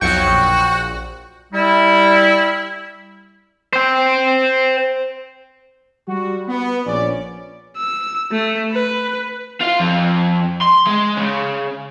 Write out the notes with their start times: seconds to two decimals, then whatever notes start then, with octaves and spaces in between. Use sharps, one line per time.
0.01 B1 F2 F#3 F#4 G5 C#6 C#7
0.26 A#1
1.53 G3 E4
3.73 C5 G5
6.08 G3 F#4
6.49 B3
6.86 A#1 C#4 D5
7.77 E6
8.31 A3
8.72 B4
9.61 F4 F5
9.80 F2
10.61 C6
10.87 G#3
11.16 C#3